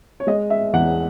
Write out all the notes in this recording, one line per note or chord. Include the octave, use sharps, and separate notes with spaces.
C#5
G#3 D#5
E5
E2 F#5